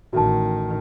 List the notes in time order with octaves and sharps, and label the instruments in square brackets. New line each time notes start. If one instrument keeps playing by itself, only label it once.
[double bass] A1 D#3 [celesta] F#4 A5